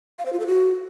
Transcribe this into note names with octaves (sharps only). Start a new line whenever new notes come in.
F5
C5
F4
A4
F#4